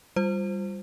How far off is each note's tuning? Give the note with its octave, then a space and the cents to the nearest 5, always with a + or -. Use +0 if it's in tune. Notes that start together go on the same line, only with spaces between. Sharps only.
G3 +0 F4 +0 C5 +0